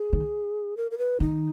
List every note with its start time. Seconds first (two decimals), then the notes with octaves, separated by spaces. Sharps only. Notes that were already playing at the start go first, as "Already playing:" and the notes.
Already playing: G#4
0.13 D#3
0.77 A#4
0.91 A#4
0.98 B4
1.20 D#3 D#4